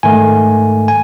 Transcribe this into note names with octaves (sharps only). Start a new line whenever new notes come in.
G#2 D#3 A3 G#5
G#5